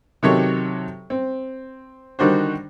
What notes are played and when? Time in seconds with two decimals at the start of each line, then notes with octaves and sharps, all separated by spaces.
0.23 C3 D#3 F#3 G4 A4 C#5
1.10 C4
2.19 D3 D#3 G3 D4 F#4 C5